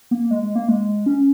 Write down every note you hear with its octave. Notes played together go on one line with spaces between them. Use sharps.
A#3
G#3
G#3
A#3
G#3
C#4